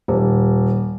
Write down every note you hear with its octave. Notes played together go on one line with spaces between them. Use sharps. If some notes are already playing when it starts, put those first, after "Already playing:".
D#1